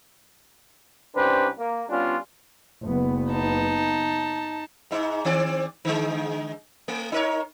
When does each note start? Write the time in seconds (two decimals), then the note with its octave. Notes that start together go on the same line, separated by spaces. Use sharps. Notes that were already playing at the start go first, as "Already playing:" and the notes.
1.14 C2 C#4 D4 G4 B4 C5
1.57 A#3
1.89 G3 B3 C#4 D4 F4
2.85 F#1 B3
3.30 D#4 A5
4.91 G#2 D#4
5.25 D#3 C4 D5
5.85 D3 G#3
6.88 A3
7.12 D#4 A#4 C#5